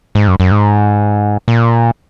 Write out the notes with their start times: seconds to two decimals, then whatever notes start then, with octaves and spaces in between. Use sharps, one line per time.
0.15 G#2
0.28 F#2
0.40 F#2
0.51 G#2
1.48 A#2